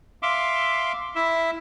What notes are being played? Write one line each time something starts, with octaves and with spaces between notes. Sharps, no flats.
E5 F5 C6 D6
E4 E5